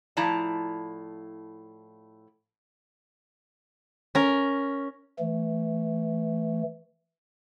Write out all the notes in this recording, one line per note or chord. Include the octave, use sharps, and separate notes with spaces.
A2 F3 E4 D5 A5 A#5
C#4 A#4
E3 A3